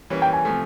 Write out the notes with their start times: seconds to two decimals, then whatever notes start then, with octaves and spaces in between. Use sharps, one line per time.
0.10 E3 G3 A#3 C#4
0.22 G5
0.33 G#5
0.45 C3 F3 A3